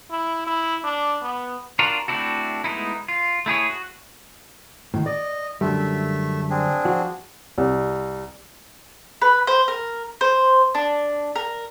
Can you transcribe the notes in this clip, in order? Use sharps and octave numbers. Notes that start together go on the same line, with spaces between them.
E4
E4
D4
B3
D4 F4 F#4 A#4
A3 C4 D4 E4 F#4
G#3 A3 B3 D#4 E4
F4
A3 E4 G#4 C#5
F#4
A2 D#3
D5 D#5
F#2 D3 G3 A3 E5
C4 D4 G#4
F3 F#4
C2
B4
C5
A#4
C5
D4
A#4